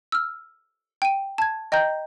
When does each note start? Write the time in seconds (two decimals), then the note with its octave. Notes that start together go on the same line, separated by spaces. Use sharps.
0.12 E6 F6
1.02 G5 D#7
1.38 A5 G#6
1.72 D#5 G5 A#5 G6